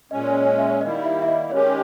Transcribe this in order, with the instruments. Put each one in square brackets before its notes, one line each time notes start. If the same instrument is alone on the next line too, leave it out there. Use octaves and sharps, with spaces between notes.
[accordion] A#2 G#3 C#4 [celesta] D#5
[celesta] C#5
E5
[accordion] D#3 G3 A#3 E4 [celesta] D#5
[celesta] E5
E5
D#5
[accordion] D#3 G#3 C#4 G4 [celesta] C#5